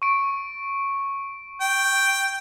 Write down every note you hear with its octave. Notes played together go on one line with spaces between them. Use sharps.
C#6 D7
G5